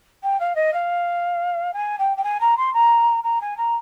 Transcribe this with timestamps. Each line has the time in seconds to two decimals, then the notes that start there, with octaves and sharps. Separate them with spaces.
0.23 G5
0.39 F5
0.55 D#5
0.73 F5
1.73 G#5
1.98 G5
2.17 G5
2.23 G#5
2.40 A#5
2.57 C6
2.73 A#5
3.23 A#5
3.41 G#5
3.57 A#5